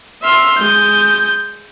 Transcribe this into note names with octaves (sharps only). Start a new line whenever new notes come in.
E5 C6 F6
G#3 G6